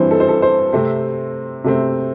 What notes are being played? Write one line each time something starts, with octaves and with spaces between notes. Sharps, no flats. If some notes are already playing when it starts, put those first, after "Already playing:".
Already playing: G2 E3 C4 C5
A4
C5
A4
C5
C3 A3 C4
C3 A3 C4